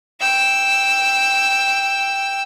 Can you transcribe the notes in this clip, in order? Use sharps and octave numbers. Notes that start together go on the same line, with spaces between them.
G5 E6